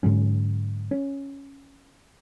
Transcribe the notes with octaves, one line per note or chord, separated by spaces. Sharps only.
G#2 D3 F#3 C#4
C#4